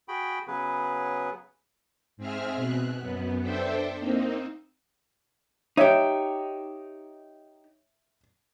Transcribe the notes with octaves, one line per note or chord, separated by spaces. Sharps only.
F#4 G#4 G5 B5
C#3 F#3 B3 G#4 B4
G#2 C4 G#4 E5 F6
B2 F#6
F#2 B3
D4 A4 C5 E5 G5
A#3 C4 D#4
D#4 G4 C#5 E5